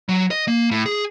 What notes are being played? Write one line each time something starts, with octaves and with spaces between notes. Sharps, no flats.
F#3
D#5
A#3
A2
G#4